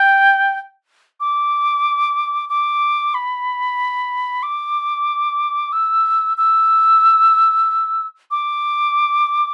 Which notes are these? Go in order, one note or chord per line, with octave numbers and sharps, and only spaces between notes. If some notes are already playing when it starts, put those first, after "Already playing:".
Already playing: G5
D6
D6
B5
D6
E6
E6
D6